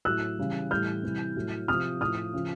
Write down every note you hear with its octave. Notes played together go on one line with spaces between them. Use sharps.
A2 F#3 E6 F#6
C#3 E3 G3
A2 E3 G3 F6 G6
C3 E3 G3
A2 F#3
C3 F3 D#6 F6
A2 F3 D#6 F6
C#3 F3